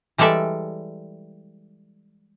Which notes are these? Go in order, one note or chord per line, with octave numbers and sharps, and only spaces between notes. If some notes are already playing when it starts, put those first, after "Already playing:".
E3 G3 G#3 A4 D5 E5